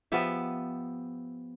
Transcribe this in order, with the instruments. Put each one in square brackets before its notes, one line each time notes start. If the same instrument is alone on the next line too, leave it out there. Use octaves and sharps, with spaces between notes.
[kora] F3 B3 G4 E5